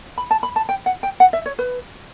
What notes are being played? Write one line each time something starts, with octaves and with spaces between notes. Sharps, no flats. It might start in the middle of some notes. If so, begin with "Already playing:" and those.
B5
A5
B5
A5
G5
F#5
G5
F#5
E5
C#5
B4